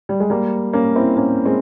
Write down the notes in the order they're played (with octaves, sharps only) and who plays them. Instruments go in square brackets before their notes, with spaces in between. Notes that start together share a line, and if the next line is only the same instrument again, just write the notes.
[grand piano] G3
G#3
G3 A#3
A#3 C#4
C4 E4
A#3 C#4
G#3 C4